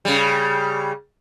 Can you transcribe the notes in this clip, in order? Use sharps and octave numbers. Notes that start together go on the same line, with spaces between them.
C#3 G3